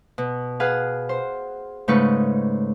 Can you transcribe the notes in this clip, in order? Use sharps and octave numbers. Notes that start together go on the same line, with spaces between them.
B2
G#4 B4 F5 F#5
C5
G#2 C#3 A3 D#4 B4 C#6